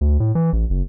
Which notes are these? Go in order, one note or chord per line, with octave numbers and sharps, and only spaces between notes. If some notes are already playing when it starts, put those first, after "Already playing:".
D2
A2
E3
A1
F#1